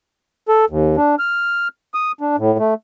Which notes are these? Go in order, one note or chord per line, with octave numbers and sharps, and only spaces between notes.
A4
D#2
D4
F6
D#6
D4
A2
A3